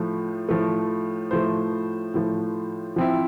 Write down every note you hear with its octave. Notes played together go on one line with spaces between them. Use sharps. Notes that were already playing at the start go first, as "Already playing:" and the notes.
Already playing: A2 F3 A3
A2 F3 A3
A2 F3 A3 C5
A2 F3 A3
F3 C4 E4